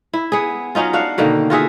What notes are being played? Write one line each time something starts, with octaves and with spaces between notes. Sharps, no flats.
E4
B3 G#4
F#3 C#4 D#4 F4
D4 F#4 F5 F#5
B2 D3 D#3 A#3
F4 F#4 G#4 E5